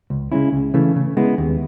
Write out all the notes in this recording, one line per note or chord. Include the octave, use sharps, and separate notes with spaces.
C#2
C#3 G#3 C#4 E4
C#2
C#3 E3 A3
C#3
G#3 B3 E4
D#2